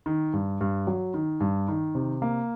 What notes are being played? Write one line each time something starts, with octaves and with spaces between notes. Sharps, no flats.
D#3
G2
G2
F#3
D#3
G2
D#3
C3
A#3